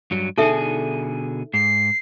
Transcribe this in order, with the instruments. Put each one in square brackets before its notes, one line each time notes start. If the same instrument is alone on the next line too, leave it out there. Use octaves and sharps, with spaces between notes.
[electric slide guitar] G2 F#3
[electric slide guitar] B2 D3 G#4 [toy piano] D#4 A4 E5
[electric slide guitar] G#2 [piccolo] C7